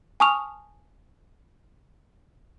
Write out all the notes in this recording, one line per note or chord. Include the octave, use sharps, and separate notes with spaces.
G#5 A5 C#6 D#6 F6 F7